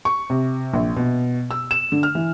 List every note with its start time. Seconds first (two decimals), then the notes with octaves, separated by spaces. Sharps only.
0.05 C#6
0.30 C3
0.73 A#1
0.96 B2
1.51 E6
1.71 E7
1.92 D3
2.03 F6
2.15 E3